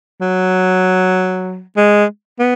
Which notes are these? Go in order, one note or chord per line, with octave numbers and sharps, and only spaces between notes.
F#3
G#3
B3